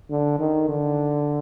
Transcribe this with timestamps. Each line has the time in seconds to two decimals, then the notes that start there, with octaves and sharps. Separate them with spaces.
0.10 D3
0.39 D#3
0.69 D3